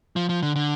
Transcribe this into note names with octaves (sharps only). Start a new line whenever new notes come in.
F3
F3
D3
D3